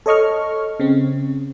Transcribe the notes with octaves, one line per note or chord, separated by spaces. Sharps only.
A4 C#5 D#5 C#6 F6
C#3 C4